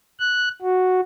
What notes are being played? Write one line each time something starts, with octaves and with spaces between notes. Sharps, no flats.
F#6
F#4